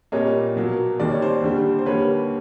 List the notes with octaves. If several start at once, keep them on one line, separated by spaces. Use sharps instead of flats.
A#2 G3 A#3 C#5 D#5
B2 F#3 A#3
D#2 D#3 G3 D5
C#5
C5 D5
D#2 D3 G3
C5
D#2 D3 G3 A#3 B4 C#5